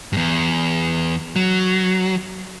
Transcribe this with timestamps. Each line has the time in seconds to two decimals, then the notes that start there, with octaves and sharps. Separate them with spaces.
0.13 E2 G2
1.36 F#3